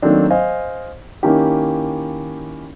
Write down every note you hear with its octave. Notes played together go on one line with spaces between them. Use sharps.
D#3 F#3 A3 A#3 C4 D4
C5 D#5 F5 G#5
D#3 A#3 C#4 E4 G4